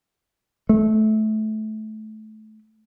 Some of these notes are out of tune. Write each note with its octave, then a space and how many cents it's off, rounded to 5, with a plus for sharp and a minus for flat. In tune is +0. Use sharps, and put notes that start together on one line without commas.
A3 -20